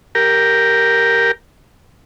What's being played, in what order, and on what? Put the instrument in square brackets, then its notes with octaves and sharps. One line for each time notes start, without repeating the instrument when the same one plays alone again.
[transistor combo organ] G4 A#4